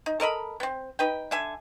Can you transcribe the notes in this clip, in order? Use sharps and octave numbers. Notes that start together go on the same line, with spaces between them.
D#4
A4 A#4 D#5 B5
B3 C4
D#4 B4 G5
D3 E5 G#5